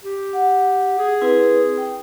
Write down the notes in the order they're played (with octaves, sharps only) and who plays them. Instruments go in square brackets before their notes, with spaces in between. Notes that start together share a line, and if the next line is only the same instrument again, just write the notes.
[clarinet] G4
[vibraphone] F#5
[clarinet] G#4
[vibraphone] C4 E4 B4
G5